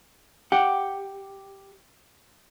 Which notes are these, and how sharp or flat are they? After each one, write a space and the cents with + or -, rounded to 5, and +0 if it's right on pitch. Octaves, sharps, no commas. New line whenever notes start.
G4 +0 F#5 +0